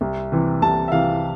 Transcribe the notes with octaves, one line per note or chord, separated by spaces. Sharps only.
C2
C3 E3
C2 A5
E5
C3 E3 F5